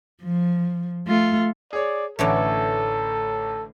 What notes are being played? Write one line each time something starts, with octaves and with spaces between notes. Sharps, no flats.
F3
A3 F4
G#4 C#5 D5
A1 D3 E3 A3 C#4 A4 D6